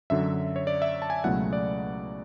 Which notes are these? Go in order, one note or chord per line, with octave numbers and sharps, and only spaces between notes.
F#2 D3 F#3 E5
C#5
D5
E5
A5
G#5
C#2 B2 F#3 A3 E4 F#5
D5